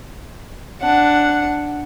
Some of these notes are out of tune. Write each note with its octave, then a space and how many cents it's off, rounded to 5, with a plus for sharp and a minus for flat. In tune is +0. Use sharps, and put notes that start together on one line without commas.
D4 +0 F#5 +0